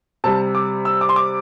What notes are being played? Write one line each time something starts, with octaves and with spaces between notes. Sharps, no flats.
C3 G3 A5
D6
E6
D6
C6
D6